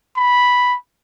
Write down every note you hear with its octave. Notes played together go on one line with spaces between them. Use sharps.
B5